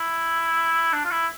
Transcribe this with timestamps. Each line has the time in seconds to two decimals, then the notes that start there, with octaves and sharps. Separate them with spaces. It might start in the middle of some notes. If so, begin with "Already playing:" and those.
Already playing: E4
0.93 D4
1.05 F4
1.11 E4